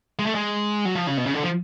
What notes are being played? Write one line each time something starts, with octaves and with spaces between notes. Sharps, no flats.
G#3
A3
G#3
F#3
F3
C#3
B2
C#3
D3
F3